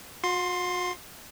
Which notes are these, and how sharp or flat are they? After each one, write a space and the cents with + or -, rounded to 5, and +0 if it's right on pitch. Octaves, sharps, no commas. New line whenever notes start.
F#4 -45 C6 +10